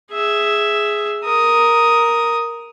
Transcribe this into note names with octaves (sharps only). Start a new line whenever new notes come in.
G#4 E5
A#4 D#6